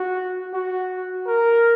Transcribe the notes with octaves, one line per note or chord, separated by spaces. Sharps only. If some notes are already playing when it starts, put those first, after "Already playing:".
Already playing: F#4
F#4
A#4